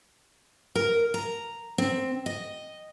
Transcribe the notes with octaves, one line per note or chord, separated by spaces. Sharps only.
A#4
A#5
C4
D#5